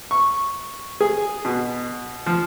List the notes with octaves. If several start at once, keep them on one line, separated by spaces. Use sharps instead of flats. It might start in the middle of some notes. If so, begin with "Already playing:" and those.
C#6
G#4
B2
F3